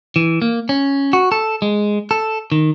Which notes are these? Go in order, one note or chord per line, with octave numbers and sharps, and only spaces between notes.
E3
A#3
C#4
F#4
A4
G#3
A4
D#3